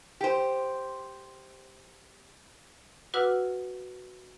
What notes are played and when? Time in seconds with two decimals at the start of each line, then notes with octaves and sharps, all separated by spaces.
0.21 G4 C5
3.14 F#4 B4 F#5 D6 E6 F6